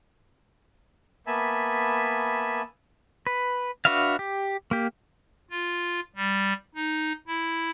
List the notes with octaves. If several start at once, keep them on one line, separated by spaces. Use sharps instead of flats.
A#3 B3 E5 G#5 A5 B5
B4
D4 F#4 B4 E5 F5
G4
A#3 G4
F4
G3
D#4
E4